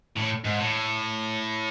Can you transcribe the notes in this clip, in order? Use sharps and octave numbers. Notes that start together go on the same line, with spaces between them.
A2
G#2
A2